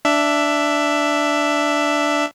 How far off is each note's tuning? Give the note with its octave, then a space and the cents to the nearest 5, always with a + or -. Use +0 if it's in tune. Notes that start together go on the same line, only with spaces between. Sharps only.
D4 +0 E5 +10